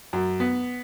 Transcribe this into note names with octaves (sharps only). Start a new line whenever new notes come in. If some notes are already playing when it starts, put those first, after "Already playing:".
F#2
B3